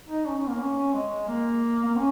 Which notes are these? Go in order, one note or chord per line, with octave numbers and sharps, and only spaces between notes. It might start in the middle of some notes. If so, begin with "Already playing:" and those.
D#4
C#4
C#4
A#3
C#4
C#4
G#3
A#3
A#3
C#4